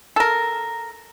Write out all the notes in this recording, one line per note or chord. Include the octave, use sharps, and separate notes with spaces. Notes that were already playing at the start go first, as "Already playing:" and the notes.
A4 A#4